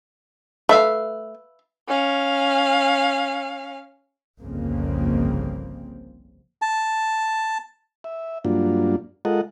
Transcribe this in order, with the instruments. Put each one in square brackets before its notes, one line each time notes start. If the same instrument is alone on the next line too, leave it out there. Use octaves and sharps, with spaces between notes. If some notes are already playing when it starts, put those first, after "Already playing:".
[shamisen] A3 [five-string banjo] B4 E5 F5
[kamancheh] C#4 F5
[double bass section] G1 C2 F2 C#3 A#3 C4
[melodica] A5
[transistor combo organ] E5
G2 F#3 A#3 D4 F4
G#3 F4 A4 A#4 D#5 F#5